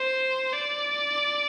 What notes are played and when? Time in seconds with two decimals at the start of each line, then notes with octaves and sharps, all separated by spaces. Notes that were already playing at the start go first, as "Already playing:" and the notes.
Already playing: C5
0.53 D5